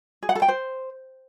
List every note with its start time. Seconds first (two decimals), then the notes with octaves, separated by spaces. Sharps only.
0.23 G#4
0.29 F#5
0.35 A4
0.42 G5
0.48 C5